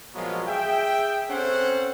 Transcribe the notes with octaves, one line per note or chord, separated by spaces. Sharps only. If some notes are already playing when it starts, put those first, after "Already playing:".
A#2 F3 F#3 G#3 B3 F4
G#4 E5 G5
C4 C#4 A4 C5 F#5